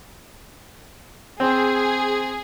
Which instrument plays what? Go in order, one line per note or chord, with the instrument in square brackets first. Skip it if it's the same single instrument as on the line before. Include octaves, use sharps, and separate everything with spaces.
[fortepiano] C4 [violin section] G#4